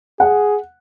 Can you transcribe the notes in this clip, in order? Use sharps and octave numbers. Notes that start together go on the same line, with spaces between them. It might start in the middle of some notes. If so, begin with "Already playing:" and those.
G#4 F#5